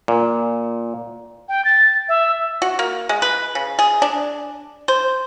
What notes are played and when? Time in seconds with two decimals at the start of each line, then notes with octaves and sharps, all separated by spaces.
0.08 A#2
1.49 G5
1.65 A6
2.09 E5
2.62 F#4
2.79 A#3
3.09 G#3
3.22 B4
3.55 C#3
3.79 G#4
4.02 D4
4.88 C5